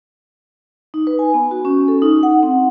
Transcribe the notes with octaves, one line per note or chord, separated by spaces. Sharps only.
D#4
B4
G#5
B3
F#4
C#4
A4
D#4
F#5
C4